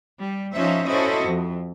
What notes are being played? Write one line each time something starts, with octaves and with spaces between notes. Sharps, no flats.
G3
F3 C#4 D#4 F4 C5 E5
C#4 E4 F#4 A4 C5 D#5
F2